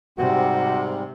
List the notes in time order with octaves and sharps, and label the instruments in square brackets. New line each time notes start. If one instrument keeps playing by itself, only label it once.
[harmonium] G#2 G3 C4 [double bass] C3 [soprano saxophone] F#4